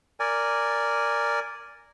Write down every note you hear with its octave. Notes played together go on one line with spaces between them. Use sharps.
A#4 D5 G#5